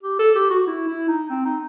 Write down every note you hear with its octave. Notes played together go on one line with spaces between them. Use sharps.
G4
A4
G4
F#4
E4
E4
D#4
C4
D#4